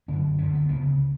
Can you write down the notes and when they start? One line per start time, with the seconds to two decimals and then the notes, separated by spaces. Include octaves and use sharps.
0.08 F#2 D3 C#4
0.38 D2 D3 C#4
0.54 B3
0.69 D2 C#3 B3